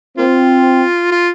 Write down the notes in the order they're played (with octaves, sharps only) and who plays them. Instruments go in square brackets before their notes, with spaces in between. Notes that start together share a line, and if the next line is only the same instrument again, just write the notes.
[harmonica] A#3 F4 [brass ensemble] C4
[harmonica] F4